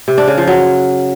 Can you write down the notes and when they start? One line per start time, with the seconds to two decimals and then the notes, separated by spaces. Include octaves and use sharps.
0.08 C3
0.18 D4
0.28 C#3
0.38 F3
0.48 F#3